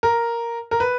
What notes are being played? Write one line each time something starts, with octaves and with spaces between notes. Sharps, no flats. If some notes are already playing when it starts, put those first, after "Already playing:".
A#4
A#4
B4